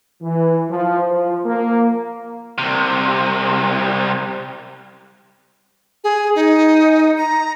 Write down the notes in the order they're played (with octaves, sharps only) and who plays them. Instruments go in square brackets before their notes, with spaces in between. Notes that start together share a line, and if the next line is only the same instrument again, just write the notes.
[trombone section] E3
F3
F3
A#3
[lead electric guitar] C2 C3
[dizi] G#4
D#4
A#5